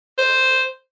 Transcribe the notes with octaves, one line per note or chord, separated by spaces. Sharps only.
C5